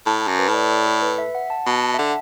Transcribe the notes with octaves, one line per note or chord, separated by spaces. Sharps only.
A2 A5
A5
F#2
B4
A2
D5
D5
A4
B4
E5
F#5
A5
B2 A5
A5
E5
D3 F#5